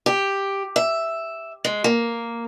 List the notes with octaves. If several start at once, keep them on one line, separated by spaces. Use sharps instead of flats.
G4
E5
G#3
A#3